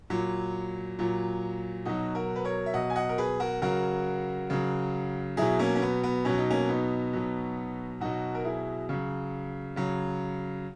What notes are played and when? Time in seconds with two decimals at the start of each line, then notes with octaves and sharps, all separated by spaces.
0.10 A#2 F#3
0.99 A#2 F#3
1.85 B2 F#3 D#4 F#4
2.15 F#4 A#4
2.36 B4
2.44 A#4 C#5
2.66 E5
2.74 B2 F#3 D#5 F#5
2.90 G#5
2.96 D#5 F#5
3.09 A#4
3.18 G#4 B4
3.40 F#4 A#4
3.62 C#3 F#3 F#4 A#4
4.50 C#3 F#3
5.37 B2 F#3 E4 G#4
5.59 A#3 C#4
5.75 C#4
5.82 B3
6.03 B3
6.25 B2 F#3 C#4
6.38 D#4
6.50 A#3 C#4
6.69 B3 D#4
7.13 B2 F#3
8.01 B2 F#3 D#4 F#4
8.35 A#4
8.45 E4 G#4
8.89 C#3 F#3
9.76 C#3 F#3